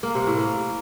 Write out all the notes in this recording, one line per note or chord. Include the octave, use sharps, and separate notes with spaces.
A#3
C3
A2
A#3